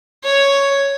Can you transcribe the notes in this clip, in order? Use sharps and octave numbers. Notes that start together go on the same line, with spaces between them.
C#5